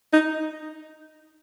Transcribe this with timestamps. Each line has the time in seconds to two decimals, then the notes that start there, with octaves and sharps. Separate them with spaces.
0.13 D#4